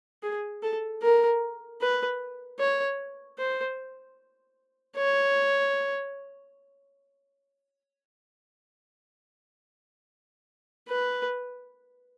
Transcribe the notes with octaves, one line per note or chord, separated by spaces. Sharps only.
G#4
A4
A#4
B4
C#5
C5
C#5
B4